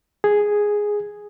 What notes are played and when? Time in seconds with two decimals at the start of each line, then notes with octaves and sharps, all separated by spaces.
0.24 G#4